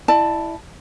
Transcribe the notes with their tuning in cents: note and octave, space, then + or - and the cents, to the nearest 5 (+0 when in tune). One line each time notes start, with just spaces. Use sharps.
E4 +0 D5 +35 A5 +0